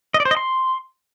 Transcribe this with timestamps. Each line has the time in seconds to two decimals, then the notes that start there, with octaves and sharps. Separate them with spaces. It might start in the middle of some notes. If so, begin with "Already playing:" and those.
0.14 D#5
0.20 D5
0.25 C5
0.31 D#5
0.37 C6